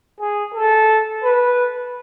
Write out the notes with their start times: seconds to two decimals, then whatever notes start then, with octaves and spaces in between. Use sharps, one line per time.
0.20 G#4
0.54 A4
1.24 B4